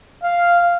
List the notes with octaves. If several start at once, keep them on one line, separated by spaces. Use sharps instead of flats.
F5